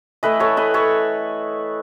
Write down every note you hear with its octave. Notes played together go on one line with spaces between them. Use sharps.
E3 A3 E4 B4 D#5
A4 C#5
B4 D#5
A4 C#5